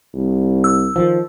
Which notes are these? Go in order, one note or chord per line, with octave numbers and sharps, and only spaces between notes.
C2
E6
D#3 F3